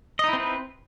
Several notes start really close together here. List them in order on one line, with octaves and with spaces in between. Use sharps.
D#5 D#4 E4 C4 B4